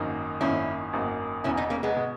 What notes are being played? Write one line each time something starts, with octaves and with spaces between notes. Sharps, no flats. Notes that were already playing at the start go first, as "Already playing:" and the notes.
Already playing: G#1 F#2 D#3 A#3 D#4
G#1 F#2 D#3 A#3 C#4 D#4 E4
G#1 F#2 D#3 A#3 D#4
E1 E2 B2 C#4 E4
B3 D#4
A#3 C#4
G#3 B3
B2